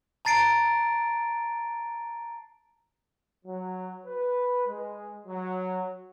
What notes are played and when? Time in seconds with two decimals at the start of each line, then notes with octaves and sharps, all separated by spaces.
0.25 A5 A#5 A6 C7 D7
3.45 F#3
4.06 B4
4.66 G#3
5.27 F#3